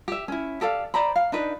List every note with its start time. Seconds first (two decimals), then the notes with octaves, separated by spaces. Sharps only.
0.08 G4 E5
0.28 C#4 E4
0.61 G4 A4 D5 F5
0.94 C5 D5 A#5 B5
1.16 F5
1.32 D4 D#4 B4